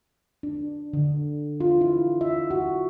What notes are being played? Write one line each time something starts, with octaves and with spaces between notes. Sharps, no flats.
D4
D3
F4
E4
E5
F#4